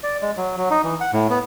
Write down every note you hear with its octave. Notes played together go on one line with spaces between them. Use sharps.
D5
G#3
F#3
F#3
D#4
E3
F#5
A2
B3